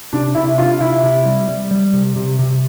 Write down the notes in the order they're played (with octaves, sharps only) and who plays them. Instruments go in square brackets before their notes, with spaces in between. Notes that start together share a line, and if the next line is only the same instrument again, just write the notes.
[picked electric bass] C3 [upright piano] D4
[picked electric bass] C3 [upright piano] E4
[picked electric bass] D4 [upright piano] F4
[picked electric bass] C3 [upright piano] E4
[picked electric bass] C3
G3
G3
G3
C3
C3
C3